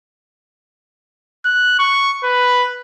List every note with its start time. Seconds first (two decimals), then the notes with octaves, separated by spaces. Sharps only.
1.45 F#6
1.79 C#6
2.24 B4